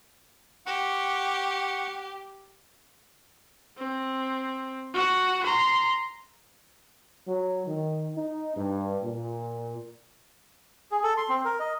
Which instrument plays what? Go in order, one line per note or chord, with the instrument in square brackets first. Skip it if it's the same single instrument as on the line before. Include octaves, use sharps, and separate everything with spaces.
[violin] G4 [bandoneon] F#5 C#6
[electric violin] C4
F#4 F#5
A#5 C6
[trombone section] F#3
D#3
D#4
G2
A#2
[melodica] G#4
A4
C6
C4
A#4
D#5